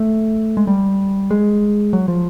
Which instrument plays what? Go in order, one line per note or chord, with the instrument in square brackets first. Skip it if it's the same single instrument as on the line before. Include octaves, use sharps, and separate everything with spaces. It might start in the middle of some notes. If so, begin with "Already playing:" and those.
Already playing: [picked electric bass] A3
G#3
G3
G#3
F#3
F3